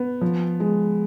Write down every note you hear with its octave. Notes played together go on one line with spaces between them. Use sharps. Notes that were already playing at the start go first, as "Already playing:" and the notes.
Already playing: B3
F3
G#3